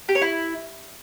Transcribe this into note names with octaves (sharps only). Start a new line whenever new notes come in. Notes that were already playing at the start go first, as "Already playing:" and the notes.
G4
C#5
E4